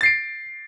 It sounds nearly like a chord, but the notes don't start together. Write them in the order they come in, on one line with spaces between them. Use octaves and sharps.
A6 C7 D7